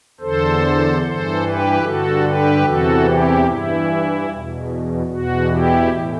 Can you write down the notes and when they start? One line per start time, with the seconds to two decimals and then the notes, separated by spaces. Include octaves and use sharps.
0.20 E2 D3 A4 C5
1.01 G2 E3 A4 C5
1.42 G4 B4
1.82 G2 D3 F#4 A4
2.23 G4 B4
2.64 E2 C3 E3 F#4 A4
3.04 E4 G4
3.45 G2 E3 E4
4.26 E2 B2
5.06 E2 B2 F#4
5.47 E4 G4
5.88 A2 E3